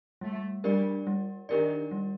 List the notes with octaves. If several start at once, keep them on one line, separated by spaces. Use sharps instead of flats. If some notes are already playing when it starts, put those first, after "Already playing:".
G3 A3
G3 D4 G4 A#4 D5
G3
D#3 D4 G4 A#4 D5
G3